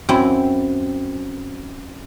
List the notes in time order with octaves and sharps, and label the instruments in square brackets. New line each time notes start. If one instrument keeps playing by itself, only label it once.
[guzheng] F#2 C4 E4